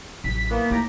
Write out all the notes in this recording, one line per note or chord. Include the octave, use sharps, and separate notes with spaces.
A1 F#3 B6
E3 A#3 B3
A2 A3 D#4 G4 A#5